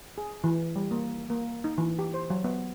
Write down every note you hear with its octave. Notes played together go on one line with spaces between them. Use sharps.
G#4
E3
G3
A#3
A#3
D#4
E3
G4
C5
F#3
B3